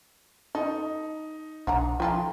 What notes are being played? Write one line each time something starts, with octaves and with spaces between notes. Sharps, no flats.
D#4 A4
B1 D4 F#5 A#5
F3 D#4 F4 A4 G5 A#5